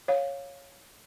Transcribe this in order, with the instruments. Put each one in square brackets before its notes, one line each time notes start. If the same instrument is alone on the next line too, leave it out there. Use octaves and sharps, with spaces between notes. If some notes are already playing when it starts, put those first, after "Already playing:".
[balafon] C#5 F5